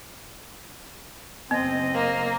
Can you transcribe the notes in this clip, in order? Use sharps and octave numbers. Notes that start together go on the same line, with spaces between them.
F#1 B3 C4 D#5
A#3